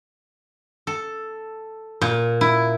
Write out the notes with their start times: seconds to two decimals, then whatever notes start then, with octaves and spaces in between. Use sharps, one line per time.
0.87 A4
2.01 A#2
2.41 E4